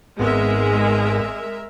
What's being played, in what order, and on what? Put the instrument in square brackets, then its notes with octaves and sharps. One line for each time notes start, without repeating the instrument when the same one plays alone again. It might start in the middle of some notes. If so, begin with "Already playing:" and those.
[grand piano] G#1 B3 [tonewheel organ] G#2 [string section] G#3 [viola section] A#4 E5